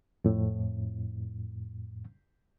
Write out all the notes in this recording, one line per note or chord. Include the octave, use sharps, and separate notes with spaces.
F2 A2